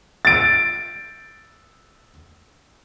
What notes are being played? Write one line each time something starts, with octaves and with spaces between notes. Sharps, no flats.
A6 D7